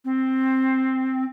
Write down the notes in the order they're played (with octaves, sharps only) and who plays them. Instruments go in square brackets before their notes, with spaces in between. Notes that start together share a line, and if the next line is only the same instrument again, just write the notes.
[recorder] C4